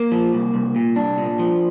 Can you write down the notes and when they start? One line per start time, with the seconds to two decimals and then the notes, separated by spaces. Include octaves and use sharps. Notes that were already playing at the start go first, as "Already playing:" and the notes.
Already playing: A#3
0.12 F3
0.33 C2
0.54 C2
0.76 A#2
0.96 C2 D4
1.18 A#2
1.39 F3